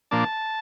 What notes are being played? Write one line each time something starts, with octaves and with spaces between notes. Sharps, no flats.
A#2 F3 A#3 D4 A5